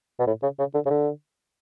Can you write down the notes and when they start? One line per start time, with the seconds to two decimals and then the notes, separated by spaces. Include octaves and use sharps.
0.20 B2
0.27 A2
0.43 C#3
0.59 C#3
0.75 D3
0.86 C#3
0.90 D3